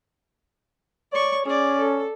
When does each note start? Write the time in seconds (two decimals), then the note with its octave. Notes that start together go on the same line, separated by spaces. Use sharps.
1.12 C#5 D5 C#6
1.45 C#4 G#4 D5
1.78 A4